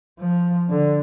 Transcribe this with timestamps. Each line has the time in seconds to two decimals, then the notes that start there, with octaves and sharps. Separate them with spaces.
0.19 F3
0.70 D3